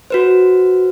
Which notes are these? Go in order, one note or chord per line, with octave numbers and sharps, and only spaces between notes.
F#4 B4 C5